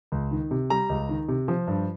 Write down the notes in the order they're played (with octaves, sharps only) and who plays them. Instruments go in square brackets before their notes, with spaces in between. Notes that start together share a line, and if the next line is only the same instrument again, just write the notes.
[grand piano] C#2
D#3
C3
G3 A#5
C#2
D#3
C3
F3
G2